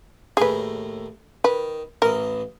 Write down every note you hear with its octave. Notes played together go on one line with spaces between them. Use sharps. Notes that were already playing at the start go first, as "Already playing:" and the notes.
D#2 A2 G#4 A#4 B4
D#3 B4
A1 E3 A#4 D#5